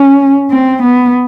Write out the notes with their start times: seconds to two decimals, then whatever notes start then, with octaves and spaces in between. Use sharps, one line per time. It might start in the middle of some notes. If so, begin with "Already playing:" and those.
Already playing: C#4
0.51 C4
0.82 B3